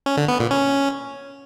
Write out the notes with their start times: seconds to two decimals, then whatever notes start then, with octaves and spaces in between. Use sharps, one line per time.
0.06 C#4
0.17 D3
0.28 B3
0.40 A#2
0.51 C#4